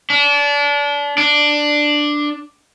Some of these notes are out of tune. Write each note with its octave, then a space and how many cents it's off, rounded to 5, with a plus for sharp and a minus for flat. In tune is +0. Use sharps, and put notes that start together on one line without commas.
D4 -30
D4 +5